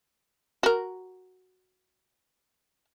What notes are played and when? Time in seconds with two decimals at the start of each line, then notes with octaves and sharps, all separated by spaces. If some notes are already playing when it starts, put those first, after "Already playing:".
0.63 F#4 A#4